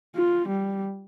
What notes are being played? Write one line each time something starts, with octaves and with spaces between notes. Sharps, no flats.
F4
G3